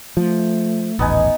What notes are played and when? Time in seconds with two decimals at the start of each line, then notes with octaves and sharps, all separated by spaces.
0.17 F3 A3
0.99 D#1 A1 B3 D#4 G#5